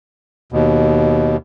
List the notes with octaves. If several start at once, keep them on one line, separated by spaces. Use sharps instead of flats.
D#2 B2